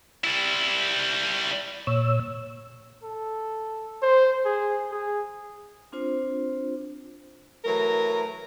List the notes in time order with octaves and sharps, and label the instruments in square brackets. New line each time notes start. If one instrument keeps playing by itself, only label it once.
[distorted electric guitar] G3 E4
[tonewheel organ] A#2 C#5 E6
[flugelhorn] A4
C5
G#4
G#4
[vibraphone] C4 D4 F4 C5
[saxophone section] E3 F#3 A3 A#4